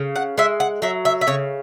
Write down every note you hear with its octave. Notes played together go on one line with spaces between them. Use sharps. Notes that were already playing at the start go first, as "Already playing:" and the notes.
Already playing: C#3
F#5
G#3 E5
F#5
F#3 E5
E5
E5
C#3 C#5